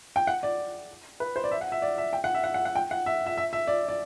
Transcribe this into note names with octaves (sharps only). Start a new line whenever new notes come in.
G5
F#5
D5
B4
C5
D5
E5
F#5
E5
D5
E5
G5
F#5
E5
F#5
F#5
F#5
G5
F#5
E5
E5
E5
E5
D5
D5